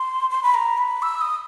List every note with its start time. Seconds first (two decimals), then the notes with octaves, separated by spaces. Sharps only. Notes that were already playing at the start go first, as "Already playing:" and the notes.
Already playing: C6
0.30 C6
0.43 B5
0.54 A#5
0.78 B5
1.02 E6
1.21 D#6